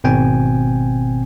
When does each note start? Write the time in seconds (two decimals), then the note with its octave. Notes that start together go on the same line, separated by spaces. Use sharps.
0.04 G#1 B2 C4 G5 G#5